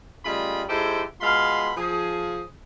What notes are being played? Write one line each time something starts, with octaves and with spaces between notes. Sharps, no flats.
C#3 G3 A3 F4 D#5 B5
G#3 D#4 E4 G4 A4 C5
B2 G#3 F4 F5 B5 C6
F3 G#4